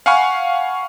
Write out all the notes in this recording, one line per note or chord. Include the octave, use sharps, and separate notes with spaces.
F5 F#5 G#5 B5 C#6 F6